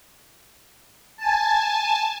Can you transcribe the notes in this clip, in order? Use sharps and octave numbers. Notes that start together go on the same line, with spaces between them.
G#5 A5